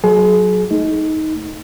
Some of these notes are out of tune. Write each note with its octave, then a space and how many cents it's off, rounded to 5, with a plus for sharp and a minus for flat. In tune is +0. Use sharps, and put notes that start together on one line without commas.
F#3 +0 G#4 +35
A3 +0 D#4 +15